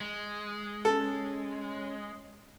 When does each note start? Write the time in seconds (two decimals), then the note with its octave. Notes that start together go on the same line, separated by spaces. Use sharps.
0.01 G#3
0.85 C#4 A4